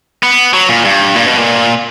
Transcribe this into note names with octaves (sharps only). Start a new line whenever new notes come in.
B3
F#3
A#2
G2
A#2
B2
A#2